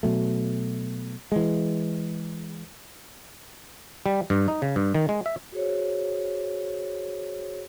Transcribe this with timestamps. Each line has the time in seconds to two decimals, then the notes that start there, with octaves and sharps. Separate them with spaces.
0.03 B2 F#3 A3
1.32 E3 G#3
4.06 G3
4.30 G2
4.48 D#4
4.62 C#3
4.76 G2
4.94 D#3
5.09 G#3
5.26 E5
5.52 F#4 G#4 C5 C#5